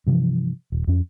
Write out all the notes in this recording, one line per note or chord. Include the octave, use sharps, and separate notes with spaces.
G2 C3 E3 F3
D#1
F2 C#4